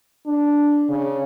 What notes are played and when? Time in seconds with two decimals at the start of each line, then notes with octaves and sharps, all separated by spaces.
0.26 D4
0.89 C#3